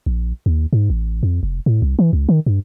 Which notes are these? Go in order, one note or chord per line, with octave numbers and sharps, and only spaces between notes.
A#1
D#2
G#2
A1
F2
F1
A2
C2
E3
C#2
D#3
G2